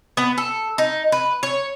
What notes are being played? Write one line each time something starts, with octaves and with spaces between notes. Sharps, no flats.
B3
A4
D#4
B4
C#5